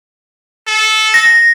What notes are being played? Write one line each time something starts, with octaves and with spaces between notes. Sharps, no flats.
A4
A#6